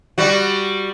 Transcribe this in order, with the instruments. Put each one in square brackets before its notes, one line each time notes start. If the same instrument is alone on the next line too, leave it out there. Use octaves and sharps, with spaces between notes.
[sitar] G3 F#4